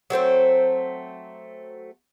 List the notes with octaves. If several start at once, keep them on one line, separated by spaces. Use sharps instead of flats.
F#3 A3 C4 C5